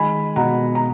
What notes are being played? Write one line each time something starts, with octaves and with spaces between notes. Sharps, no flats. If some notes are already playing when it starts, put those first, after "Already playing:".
Already playing: D#3 G#3 G#5 B5
B2 F#5 A#5
A#5